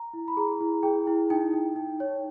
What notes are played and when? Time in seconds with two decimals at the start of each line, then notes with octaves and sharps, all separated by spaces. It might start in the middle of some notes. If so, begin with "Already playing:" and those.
Already playing: A#5
0.13 E4
0.28 B5
0.37 G#4 A#5
0.61 E4
0.83 G#4 G5
1.07 E4
1.30 D#4 G5
1.53 D#4
1.76 D#4
2.00 C#5